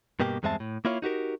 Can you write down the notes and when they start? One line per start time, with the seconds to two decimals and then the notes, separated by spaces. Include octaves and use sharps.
0.20 G2 B2 A#3 G4
0.43 E2 G2 G#3 C4 E5 A5
0.60 A2
0.85 A#3 E4 F4 C#5 F5
1.02 D#4 F#4 G4 A#4